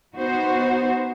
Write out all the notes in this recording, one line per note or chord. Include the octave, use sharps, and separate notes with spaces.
B3 D#4 F#4 C5